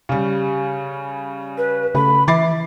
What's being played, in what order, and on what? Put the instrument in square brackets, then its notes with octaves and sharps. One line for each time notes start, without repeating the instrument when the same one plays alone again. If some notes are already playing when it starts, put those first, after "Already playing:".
[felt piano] C#3 G3
[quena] B4
[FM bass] C#3 [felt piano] A3 [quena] B5
[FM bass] E3 [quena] E5 [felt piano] D6 A6 C7